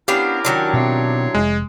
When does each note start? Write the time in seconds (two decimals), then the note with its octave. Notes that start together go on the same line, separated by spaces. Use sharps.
0.08 B3 C#4 D4 E4 G4 A#4 F5
0.45 D#3 F#3 D4
0.73 B2 C4 E4 C#5 C6
1.35 F1 G#3